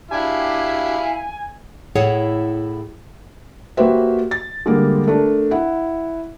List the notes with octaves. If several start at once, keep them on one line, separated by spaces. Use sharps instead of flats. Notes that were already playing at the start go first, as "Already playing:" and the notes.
D4 E4 G4 F5 G#5
A2 E4 G#4 A4 C#5 F#5
A#3 F#4 G4 B4 C5 E5
A6
D3 G3 G#3 A#3 A#4
A3 D4 A#4
E4 F#5